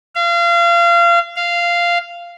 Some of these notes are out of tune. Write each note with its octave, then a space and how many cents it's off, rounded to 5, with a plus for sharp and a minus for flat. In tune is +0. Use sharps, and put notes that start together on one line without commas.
F5 -30
F5 -10